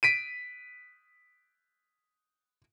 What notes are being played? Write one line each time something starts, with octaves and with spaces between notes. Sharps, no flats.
B6 D7 D#7